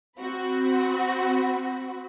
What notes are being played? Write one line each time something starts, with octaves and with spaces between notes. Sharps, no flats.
C4 F#4 B5